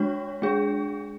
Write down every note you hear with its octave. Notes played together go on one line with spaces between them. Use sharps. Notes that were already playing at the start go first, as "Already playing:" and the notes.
Already playing: G#3 D4 F#4 C#5
G#3 D4 G#4